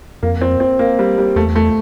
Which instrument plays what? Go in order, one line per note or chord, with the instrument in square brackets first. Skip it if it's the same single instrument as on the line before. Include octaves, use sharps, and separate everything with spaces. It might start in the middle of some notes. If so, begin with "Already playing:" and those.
[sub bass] F2 [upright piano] A#3
[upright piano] C4
C4
A#3
G3
G3
[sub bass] E2 [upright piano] A3
[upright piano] A3